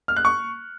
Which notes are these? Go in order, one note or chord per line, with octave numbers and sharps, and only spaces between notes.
F6
F#6
C#6